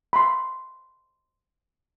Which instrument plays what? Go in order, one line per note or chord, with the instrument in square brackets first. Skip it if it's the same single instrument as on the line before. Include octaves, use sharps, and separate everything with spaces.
[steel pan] B5 C6